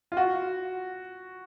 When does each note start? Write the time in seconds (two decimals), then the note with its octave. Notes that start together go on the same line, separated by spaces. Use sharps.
0.12 F4
0.17 F#4